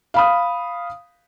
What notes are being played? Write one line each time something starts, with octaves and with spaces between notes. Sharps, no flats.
F5 B5 D#6